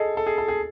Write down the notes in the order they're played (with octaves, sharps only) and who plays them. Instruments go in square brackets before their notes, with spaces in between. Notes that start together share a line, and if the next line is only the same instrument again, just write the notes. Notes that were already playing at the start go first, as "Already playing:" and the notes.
Already playing: [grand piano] G#4 A4 [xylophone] D#5
[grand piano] A4
G#4
A4
G#4